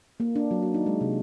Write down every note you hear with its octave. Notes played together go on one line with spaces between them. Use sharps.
A#3
D4
F#3
F#4
D#4
G#3
C3